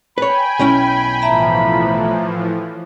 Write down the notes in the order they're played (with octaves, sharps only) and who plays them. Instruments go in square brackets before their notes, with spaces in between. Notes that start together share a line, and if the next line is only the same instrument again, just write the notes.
[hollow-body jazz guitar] B4 C#5 [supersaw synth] G5 G#5 [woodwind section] B5
[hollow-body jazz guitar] B1 C#4 E4
[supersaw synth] A2 E3 F3 [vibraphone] E5 A5 A#5